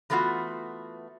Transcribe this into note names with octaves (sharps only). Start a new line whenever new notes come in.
E3 A3 B3 F4 F#4